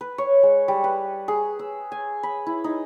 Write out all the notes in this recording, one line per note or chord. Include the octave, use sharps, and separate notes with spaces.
B4
C#5
G#3
G3
B4
G#4
E6
G#5
B5
E4
D#4